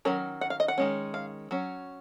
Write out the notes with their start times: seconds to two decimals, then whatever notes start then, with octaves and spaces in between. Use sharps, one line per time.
0.05 D#3 F#3 C#4 A#4
0.41 F#5
0.50 F5
0.60 D#5
0.68 F#5
0.78 D#3 G#3 C#4
1.14 F5
1.51 F#3 C#4